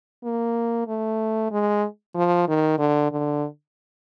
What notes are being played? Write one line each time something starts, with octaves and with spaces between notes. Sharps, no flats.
A#3
A3
G#3
F3
D#3
D3
D3